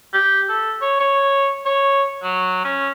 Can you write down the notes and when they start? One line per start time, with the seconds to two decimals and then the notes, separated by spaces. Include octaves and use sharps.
0.14 G4
0.49 A4
0.81 C#5
1.00 C#5
1.65 C#5
2.23 F#3
2.64 C#4